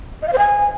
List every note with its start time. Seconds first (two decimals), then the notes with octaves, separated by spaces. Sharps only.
0.22 D#5
0.28 F5
0.33 C5
0.38 G#5